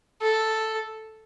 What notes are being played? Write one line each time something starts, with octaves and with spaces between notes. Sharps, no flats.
A4